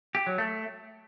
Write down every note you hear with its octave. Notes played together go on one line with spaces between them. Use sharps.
G4
F#3
A3